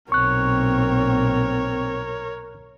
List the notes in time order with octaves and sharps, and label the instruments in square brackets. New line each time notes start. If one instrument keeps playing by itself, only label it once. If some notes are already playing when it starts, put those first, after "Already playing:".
[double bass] B1 A#2 [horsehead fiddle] C4 [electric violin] A#4 C#5 [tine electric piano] C#6 F#6